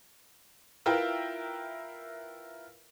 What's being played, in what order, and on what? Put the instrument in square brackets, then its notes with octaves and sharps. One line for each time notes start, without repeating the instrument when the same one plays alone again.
[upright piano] E4 F4 A#4 B4 E5 G5